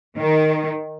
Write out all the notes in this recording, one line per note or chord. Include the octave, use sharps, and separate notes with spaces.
D#3